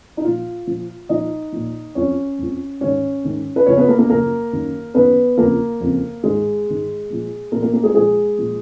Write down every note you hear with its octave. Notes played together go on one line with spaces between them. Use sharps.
D#4
A#2 F3 F4
A#2 F3
A#2 F3 D#4 D#5
A#2 F3
F2 F3 C#4 C#5
F2 F3
G#2 D#3 C#4 C#5
G#2 D#3
B4
F#2 C#3 F3 C#4 C#5
B3 B4
A#3 A#4
A#3 A#4
F#2 C#3 F3 A#3 A#4
F#2 D#3
F#2 D#3 B3 B4
F2 C#3 F3 A#3 A#4
F2 C#3 F3
G#2 D#3 G#3 G#4
G#2 D#3
A#2 F3
A#2 F3 A#3 A#4
A#3 A#4
A#3 A#4
G#3 G#4
A#2 F3 G#3 G#4
A#2 F3